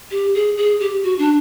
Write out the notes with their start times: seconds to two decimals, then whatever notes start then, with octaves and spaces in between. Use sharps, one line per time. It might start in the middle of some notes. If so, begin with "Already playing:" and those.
0.11 G4
0.35 G#4
0.57 G#4
0.80 G4
1.03 F#4
1.19 D4